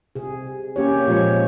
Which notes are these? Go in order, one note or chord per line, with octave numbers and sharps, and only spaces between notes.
C3 G#4
A#3 C#4 G4 C#5
A#2 F3 G#3 C#5